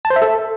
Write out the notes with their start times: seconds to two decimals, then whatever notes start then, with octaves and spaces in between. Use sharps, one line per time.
0.05 A5
0.10 C5
0.16 E5
0.22 A4